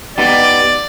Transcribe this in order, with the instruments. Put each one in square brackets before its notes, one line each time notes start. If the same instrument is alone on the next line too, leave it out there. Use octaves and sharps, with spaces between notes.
[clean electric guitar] B3 D#4 G4 [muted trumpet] D5